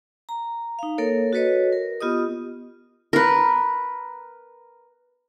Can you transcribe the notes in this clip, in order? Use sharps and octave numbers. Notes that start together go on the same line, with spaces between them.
A#5
D#4 F5
A#3 A4 A#4 C#5
F#4 A4 B4 C#5 D#5
A#4
B3 F4 G4 D#5 D#6
A#4 B4